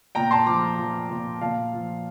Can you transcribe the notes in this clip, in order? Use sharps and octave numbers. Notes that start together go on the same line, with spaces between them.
A#2 G5 A#5
A5 C6
F3 A#5 D6
F3
A#2
A#2 F5 A5
F3